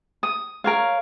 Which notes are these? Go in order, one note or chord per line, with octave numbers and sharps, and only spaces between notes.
D#6
A#4 C#5 F5